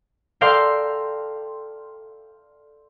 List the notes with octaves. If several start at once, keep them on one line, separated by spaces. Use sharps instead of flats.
A4 A#4 D5 F5 G5 C6